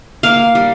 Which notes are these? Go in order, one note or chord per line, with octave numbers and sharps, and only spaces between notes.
A#3 F5
G3